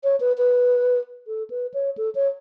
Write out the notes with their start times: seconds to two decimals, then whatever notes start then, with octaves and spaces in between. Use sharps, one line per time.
0.04 C#5
0.20 B4
0.38 B4
1.27 A4
1.50 B4
1.74 C#5
1.97 A4
2.15 C#5